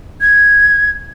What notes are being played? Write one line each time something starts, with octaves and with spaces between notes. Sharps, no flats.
G#6